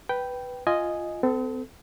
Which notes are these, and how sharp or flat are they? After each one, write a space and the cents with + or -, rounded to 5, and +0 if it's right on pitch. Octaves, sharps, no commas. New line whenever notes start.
B4 +0 G5 -10
F4 -5 D#5 +0 G#5 +0
C4 -40 A4 +0